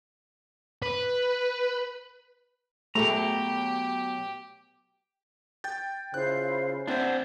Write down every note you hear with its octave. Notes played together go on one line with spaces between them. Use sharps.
B4
B2 F#3 A3 G4 G#4 A#5
G5 G6 A6
C#3 E4 F4 C5 F#6
C4 D4 E4 C5 F#5